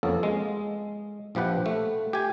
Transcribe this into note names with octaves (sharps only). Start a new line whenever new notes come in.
F2 A#3 B3 C#4 A4
G#3
A#1 F3 G4 B4 F#5
A3
G4 G#5